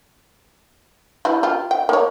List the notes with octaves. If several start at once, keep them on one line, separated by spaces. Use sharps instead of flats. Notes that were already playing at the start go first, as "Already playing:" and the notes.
E3 G3 E4
F4 G4
G5
A#3 C#5